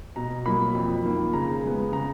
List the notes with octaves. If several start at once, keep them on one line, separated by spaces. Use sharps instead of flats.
B2 A#5
F#3 A#3 B5
F2
D#3 A#3
C#3 A#5
G#3 B3
C#3 A#5